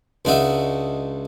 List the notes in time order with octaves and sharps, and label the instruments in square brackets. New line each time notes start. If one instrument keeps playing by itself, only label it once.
[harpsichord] C#2 D4 D#4 F#4 E5